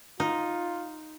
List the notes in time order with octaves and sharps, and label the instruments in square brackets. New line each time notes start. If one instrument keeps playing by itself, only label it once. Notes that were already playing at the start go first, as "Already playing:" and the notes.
[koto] D#4 [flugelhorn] F4